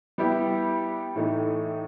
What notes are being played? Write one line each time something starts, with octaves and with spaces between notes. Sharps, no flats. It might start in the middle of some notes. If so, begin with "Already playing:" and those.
G3 B3 E4 G4
A2 E3 A3 D#4